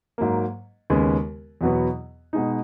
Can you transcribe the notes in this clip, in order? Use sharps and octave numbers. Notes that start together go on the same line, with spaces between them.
G#2 F#3 A#3
D#2 C#3 G#3 B3
E2 B2 F#3 B3 F#4
B2 G#3 D#4